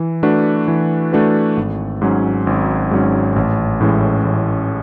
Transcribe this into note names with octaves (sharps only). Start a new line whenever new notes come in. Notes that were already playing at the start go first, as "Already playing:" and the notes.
Already playing: E3
A3 D4 F#4 B4
E3
A3 D4 F#4 B4
G#1
G#2 F#3 C#4
G#1
G#2 F#3 C#4
A1
A2 E3 G#3 C#4
A1